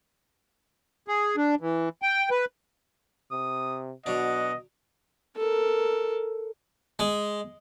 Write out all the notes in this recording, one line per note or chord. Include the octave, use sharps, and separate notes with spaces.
G#4
D4
E3
G5
B4
C3 D#6
B2 F#3 D4 D#5 F#5
A4 A#4
G#3